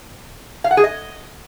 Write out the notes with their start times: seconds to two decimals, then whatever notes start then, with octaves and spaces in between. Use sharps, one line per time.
0.64 F5
0.71 F#5
0.77 G#4
0.84 D#5